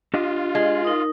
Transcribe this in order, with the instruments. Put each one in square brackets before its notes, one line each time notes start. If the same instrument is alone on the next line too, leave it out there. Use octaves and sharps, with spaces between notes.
[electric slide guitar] D4 G4 D#5 [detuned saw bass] F4
[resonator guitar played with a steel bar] G#3
[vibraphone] D#4 A#4 D#6